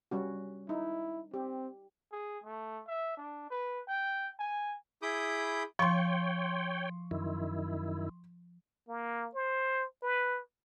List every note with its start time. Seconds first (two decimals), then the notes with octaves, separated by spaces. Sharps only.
0.11 G3 C#4 F#4
0.69 D#4 E4
1.34 C4 G4
2.12 G#4
2.44 A3
2.88 E5
3.17 D4
3.51 B4
3.88 G5
4.39 G#5
5.02 E4 G#4 B5 D6 D#6 G6
5.79 F3 C#5 G5 C6 C#6
7.11 F#2 D#3 E4
8.89 A#3
9.35 C5
10.03 B4